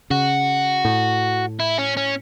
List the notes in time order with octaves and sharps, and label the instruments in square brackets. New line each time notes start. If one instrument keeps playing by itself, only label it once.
[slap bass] C#3 [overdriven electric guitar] F#4
[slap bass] A2
[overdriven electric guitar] E4
C#4
C#4